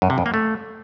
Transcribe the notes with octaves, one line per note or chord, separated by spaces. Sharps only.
F#2
C3
F2
A#3
A3